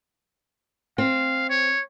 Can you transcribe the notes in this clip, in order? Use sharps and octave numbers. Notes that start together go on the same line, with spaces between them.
C4 F5
C#5